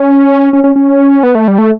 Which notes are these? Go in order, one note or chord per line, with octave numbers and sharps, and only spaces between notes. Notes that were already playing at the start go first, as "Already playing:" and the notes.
Already playing: C#4
C#4
C#4
C#4
B3
A3
G3
A3